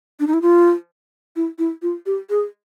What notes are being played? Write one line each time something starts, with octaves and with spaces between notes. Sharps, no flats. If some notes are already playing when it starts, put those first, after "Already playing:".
D4
D#4
E4
F4
E4
E4
F4
G4
G#4